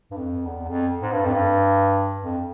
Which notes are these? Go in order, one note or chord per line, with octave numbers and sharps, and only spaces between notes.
G2
F2
E2
F2
G#2
G2
F2
G2
F2